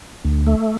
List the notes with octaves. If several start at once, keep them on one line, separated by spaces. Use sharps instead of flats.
D2
A3